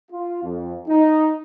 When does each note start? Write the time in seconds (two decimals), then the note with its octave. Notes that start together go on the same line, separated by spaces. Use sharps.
0.11 F4
0.43 F2
0.88 D#4